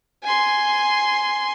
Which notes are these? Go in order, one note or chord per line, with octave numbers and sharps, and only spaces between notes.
G#5 C6